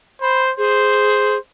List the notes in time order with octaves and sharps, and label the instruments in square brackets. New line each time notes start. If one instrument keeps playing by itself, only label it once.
[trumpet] C5 [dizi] B5
[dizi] G#4 [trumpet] C5